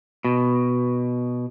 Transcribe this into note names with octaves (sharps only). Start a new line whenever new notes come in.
B2